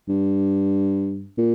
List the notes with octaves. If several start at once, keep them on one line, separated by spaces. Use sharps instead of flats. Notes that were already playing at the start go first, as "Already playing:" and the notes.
G2
A#2